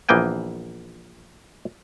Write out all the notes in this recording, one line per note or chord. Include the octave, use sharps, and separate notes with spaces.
A#1 E3 A#3 B3 G5 G#5